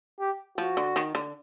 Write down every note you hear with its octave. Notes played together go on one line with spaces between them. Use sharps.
G4
F3 F#4
D3
D#3
D3